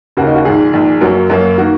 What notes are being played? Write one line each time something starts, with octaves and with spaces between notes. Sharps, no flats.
D#2 C#3 A#3 F#4
D#4
F#4
A#1 G#2 D#3 G#4
A#1 G#2 D#3
F#2 F#3 A#3 A#4
F#2 F#3 A#3
D#3 A#3 F#4